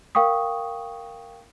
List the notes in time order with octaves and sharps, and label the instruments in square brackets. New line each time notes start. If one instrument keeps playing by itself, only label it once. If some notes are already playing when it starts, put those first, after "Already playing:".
[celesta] A#4 F5 G5 C#6 D#6